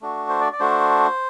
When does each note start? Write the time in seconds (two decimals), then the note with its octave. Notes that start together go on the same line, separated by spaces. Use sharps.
0.01 A3 D4 F#4
0.29 C5
0.41 D5
0.52 D5
0.60 A3 D4 F#4 C5